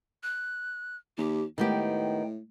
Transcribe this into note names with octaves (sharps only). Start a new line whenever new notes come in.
F#6
D#2 G4
A2 D#3 G#3 A3 B3 G4 G5